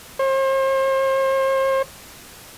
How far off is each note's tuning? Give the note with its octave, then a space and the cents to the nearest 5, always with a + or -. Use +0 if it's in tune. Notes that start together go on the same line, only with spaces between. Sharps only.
C5 +40